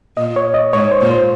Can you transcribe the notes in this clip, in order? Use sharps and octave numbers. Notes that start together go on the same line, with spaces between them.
A#2 D#5
C#5
D#5
G#2 C#5
C5
A#2
C5